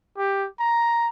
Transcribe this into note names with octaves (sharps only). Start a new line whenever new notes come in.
G4
A#5